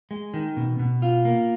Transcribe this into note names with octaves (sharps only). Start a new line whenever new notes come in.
G#3
D#3
B2
B2
F4
A#3